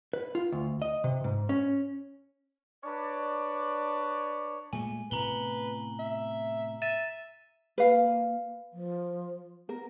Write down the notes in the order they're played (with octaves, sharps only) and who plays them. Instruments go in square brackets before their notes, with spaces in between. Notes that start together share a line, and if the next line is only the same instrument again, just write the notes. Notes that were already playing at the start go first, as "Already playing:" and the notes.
[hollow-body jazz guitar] B4
F4
D2
D#5
C3
G#2
C#4
[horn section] D4 B4 C#5 D5
[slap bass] A#2 G#3 A3 [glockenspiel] G#5
[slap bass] A2 C3 B3 [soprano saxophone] B4 [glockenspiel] A#5 F#7 G7
[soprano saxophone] E5
[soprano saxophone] E5 [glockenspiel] A6 D#7 E7
[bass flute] A#3 [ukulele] B4 F5
[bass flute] F3
[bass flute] B3 [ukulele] A#4